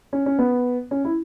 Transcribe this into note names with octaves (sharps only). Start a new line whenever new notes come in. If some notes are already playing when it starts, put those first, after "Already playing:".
C#4
C#4
B3
C#4
E4